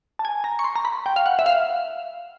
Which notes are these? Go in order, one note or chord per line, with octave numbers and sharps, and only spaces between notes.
A5
G#5
A#5
C#6
C6
A#5
B5
G5
F5
F#5
E5
F5